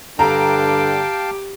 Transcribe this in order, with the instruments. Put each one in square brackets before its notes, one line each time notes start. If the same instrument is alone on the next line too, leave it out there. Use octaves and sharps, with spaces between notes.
[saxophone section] G2 D3 [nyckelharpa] G4 D6 [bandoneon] F5 G5 A5 [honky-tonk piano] A#5